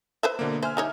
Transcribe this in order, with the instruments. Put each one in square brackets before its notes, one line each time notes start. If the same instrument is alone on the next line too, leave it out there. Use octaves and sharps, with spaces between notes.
[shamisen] B4 C5 E5
[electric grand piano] B2 D3 A#3
[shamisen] C5 [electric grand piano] E5 G#5 F6
[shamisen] G3 D#4 C#5